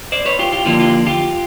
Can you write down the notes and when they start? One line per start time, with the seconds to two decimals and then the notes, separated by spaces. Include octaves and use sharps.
0.12 C5 D5
0.26 B4 C#5
0.39 F4 G4
0.52 F4 G4
0.66 D3 F3 A#3 D4 F4 G4
0.80 F4 G4
1.06 F4 G4